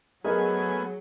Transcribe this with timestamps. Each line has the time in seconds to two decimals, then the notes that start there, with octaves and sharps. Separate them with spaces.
0.24 F#3 A3 B3 G#4 A#4 D#5 G#5